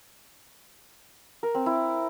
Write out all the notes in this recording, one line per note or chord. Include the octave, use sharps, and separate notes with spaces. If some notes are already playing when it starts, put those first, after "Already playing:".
A#4
C4
E4